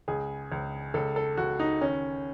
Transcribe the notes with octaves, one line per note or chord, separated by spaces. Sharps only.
C#2 G#4
C#2
C#2 A4
A4
C#2 F#4
D#4
D#3 C#4